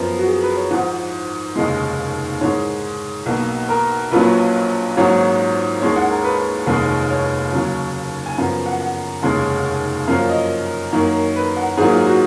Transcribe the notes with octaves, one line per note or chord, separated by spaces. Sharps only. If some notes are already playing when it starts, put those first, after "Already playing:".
Already playing: F#2 F3 B3
F#4
G#4
B4
C#5
G#1 G#2 F3 F#5
F1 D#2 C#3 G#3 D#5
G#2 D#3 G#3 C#5
B1 B2 A#3
A#4
A#1 A#2 F#3 A#3 C#4 B4
G#1 G#2 F#3 A#3 C#4 C#5
D#2 D#3 G#3 C#4 C#5
F#5
A#4
B4
F1 D#2 D#3 G#3 C#4
C#5
D#2 C#3 F#3
G#5
F#2 C#3 F3 B3 F#5
F#5
F#5
F1 D#2 C#3 G#3 C#4
F#2 F3 A#3 C#4 F5
D#5
F#2 D#3 A#3 C#4
B4
F#5
G#2 D#3 F#3 A#3 G#4
F4
F#4